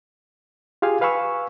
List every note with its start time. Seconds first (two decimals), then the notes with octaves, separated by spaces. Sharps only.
0.82 F4 G4 G#4 F5 G#5
1.01 B4 F5 G#5 B5 C#6 E6